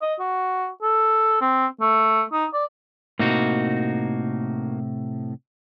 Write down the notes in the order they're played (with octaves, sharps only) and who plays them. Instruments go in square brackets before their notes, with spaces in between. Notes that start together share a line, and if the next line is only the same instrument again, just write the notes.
[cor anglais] D#5
F#4
A4
C4
A3
D#4
D5
[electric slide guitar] A2 C3 [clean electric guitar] A#3 D#4 F#4